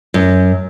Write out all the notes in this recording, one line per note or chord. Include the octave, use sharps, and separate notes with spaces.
F#2